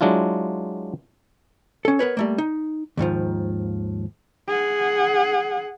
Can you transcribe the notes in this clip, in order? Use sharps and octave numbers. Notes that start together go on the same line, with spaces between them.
F#3 G#3 D4 E4 F4
C#4 A4
B3 A#4 B4 C#5
G3 A3 A#3
D#4
D#2 G#2 D#3 F3
G#4 F#5